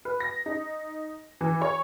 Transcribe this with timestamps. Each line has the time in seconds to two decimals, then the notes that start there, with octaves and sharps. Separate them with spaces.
0.05 B4
0.20 A#6
0.46 D#4
1.41 E3
1.62 C#5